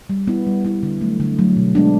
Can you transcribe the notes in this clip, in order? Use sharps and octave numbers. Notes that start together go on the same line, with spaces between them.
G3
B3 E4
G3
B3 E4
D3
F#3 A3
D3
F#3 A3
B2
G#3 B3 D4